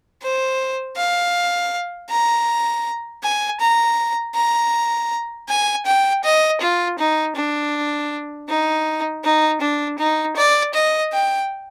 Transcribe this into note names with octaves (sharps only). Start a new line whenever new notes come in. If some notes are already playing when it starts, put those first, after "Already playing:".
C5
F5
A#5
G#5
A#5
A#5
G#5
G5
D#5
F4
D#4
D4
D#4
D#4
D4
D#4
D5
D#5
G5